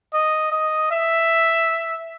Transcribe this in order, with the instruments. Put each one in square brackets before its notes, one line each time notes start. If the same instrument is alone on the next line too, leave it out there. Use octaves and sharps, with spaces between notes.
[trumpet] D#5
D#5
E5